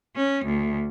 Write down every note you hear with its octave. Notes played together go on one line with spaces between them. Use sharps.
C#4
D2